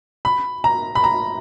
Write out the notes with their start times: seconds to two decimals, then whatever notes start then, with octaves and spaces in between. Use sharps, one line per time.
0.25 B5
0.64 A#5
0.95 B5
1.04 A#5